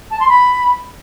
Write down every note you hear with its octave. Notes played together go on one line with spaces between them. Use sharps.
A5
C6
B5